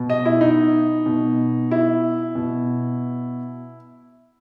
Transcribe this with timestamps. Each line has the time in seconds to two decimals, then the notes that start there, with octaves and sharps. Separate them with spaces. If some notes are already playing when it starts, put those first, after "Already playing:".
Already playing: B2
0.10 D#5
0.25 E4
0.41 D#4
1.06 B2
1.71 E4
2.35 B2